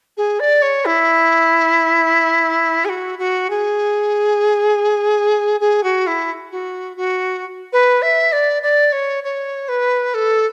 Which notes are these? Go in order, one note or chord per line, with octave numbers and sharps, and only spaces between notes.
G#4
D5
C#5
E4
G#4
F#4
F#4
G#4
G#4
F#4
E4
F#4
F#4
B4
E5
D5
D5
C#5
C#5
B4
A4